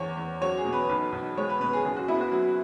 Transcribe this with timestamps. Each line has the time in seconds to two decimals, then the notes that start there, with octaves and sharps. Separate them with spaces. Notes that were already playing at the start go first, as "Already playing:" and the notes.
Already playing: E2 C#5
0.17 E2
0.41 F#3 C#5
0.57 G#4
0.65 B2
0.73 B4
0.89 B1 B4
1.12 B1
1.37 G#3 C#5
1.49 B4
1.60 B2 B4
1.73 G#4
1.85 F#1 G#4
1.97 F#4
2.08 B3 E4
2.21 F#4
2.32 F#3